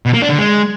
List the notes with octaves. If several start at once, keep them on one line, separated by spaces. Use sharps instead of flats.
B2
A#3
D4
D3
G#3